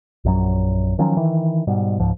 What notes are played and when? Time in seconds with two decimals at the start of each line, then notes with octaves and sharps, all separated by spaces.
0.25 A#1 F#2 F#3
0.99 D#3 F3 F#3 C#4
1.16 D#3 E3
1.67 G#2 B2 G3
2.00 C#2 G#2 F3